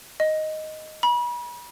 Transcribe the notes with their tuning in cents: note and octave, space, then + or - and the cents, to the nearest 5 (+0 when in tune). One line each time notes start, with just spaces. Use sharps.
D#5 +0
B5 -35